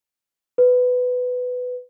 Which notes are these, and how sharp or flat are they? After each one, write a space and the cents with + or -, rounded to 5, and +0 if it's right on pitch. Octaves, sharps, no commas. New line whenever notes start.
B4 +10